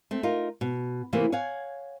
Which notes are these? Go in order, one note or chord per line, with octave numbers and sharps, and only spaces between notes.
A3 C4
D#4 F4 A#4
B2
C3 E3 A3 A#3
C#5 F5 F#5 G#5